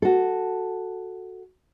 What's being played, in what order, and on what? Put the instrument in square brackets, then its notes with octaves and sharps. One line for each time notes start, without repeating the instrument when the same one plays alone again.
[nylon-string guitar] F#4 A4